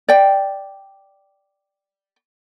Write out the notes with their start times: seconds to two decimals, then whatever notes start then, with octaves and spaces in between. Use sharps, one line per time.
0.09 D5 G5